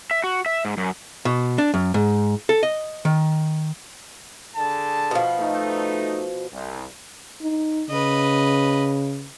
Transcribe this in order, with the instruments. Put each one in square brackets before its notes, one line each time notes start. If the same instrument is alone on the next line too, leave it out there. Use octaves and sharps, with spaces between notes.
[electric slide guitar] E5
F#4
E5
G#2
F#2
[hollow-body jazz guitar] B2
D4
F#2
G#2
A4
D#5
D#3
[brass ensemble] D3 G#4 A5
[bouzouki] B2 F3
[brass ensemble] A3 D#4
C2
[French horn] D#4
[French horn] C#3 [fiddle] B4 D#5